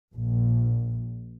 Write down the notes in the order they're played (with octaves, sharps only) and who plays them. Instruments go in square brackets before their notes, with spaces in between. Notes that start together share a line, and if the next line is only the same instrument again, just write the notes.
[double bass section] A#1